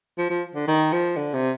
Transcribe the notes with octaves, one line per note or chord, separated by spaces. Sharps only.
F3
F3
D3
D#3
F3
D3
C3